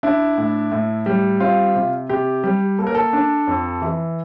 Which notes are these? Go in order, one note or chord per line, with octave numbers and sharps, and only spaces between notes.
D4 E4
A2
A2
G3
C4 F4
C3
C3 G4
G3
A#3 A4
A#4
A4
D4
F2
E3